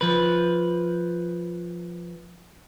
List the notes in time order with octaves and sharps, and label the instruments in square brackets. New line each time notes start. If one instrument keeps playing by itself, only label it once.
[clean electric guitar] F3 B4